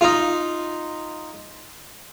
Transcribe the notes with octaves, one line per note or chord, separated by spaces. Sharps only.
D#4 F4